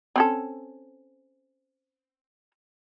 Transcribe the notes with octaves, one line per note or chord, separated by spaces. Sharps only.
C4 C#4 A4